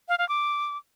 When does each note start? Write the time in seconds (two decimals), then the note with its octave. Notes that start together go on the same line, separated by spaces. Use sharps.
0.08 F5
0.19 F5
0.29 D6